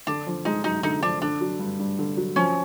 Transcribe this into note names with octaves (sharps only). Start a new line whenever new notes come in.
D3 D4
F3
G#3 D#4
F#2 D#4
D3 D#4
F3 D4
D3 D4
F#3
G2
G2
D3
F#3
F3 C#4